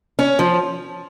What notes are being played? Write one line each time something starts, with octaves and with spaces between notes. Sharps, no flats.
C#4
F3